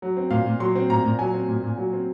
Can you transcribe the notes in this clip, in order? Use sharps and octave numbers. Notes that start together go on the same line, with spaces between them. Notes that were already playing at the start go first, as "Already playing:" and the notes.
F#3
C4
A#2 F5
A#2
F#3 C6
C4
A#2 A#5
A#2
F#3 G#5
C4
A#2
A#2
F#3
C4